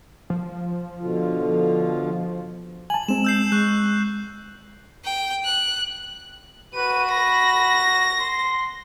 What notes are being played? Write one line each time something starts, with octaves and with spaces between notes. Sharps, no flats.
F3
B2 D3 F4
G#5 A5 F#7
G#3 C4 E7
E6 G6 C7
G#3 C#6 F#6
G5
F#6
F#4 B4 D#7
B5 A#6
C6